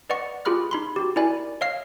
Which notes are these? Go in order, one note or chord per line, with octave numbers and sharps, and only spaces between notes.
B4 D5 D#5 F#5 C#6
F4 G4 G#4 B5 F6 F#6
D#4 B5 C6
F#4 G4
E4 A#4 D5 G#5 B5
C#5 D#5 F5 F6 C7